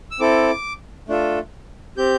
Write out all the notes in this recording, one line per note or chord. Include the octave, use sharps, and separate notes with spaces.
E6
C4 E4 A4 D6
A3 D4 F4 A4
C4 G4 G6